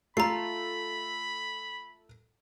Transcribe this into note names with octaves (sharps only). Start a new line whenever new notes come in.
A3 F4 A4 A#5 B5 C7